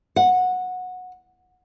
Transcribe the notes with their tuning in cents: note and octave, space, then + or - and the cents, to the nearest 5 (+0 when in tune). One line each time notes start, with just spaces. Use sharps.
F#5 -15